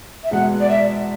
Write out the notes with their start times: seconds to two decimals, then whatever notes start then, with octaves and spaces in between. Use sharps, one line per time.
0.23 E5
0.31 E2 B2 G#3 F#5
0.59 D5
0.69 E5